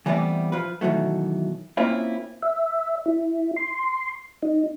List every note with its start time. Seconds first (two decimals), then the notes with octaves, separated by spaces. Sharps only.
0.06 E3 G3 A3 B3 C4 D5
0.52 F3 B4
0.81 B2 D#3 E3 F#3 A3
1.77 A#3 C4 C#4 E4 F4
2.42 E5
3.06 E4
3.56 C6
4.43 D#4